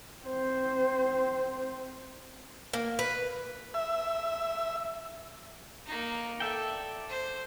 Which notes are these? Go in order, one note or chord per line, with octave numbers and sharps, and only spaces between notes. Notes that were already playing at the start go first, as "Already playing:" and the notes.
C4 C5
A#3
B4
E5
A#3 D#4
A4 D5 E5 G5
C5